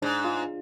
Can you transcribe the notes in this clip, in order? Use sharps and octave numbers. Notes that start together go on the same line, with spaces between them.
G#2 D4
F4